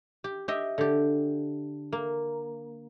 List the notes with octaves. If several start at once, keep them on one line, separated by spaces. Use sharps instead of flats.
G4
G4 D#5 E5
D3 G4
A#3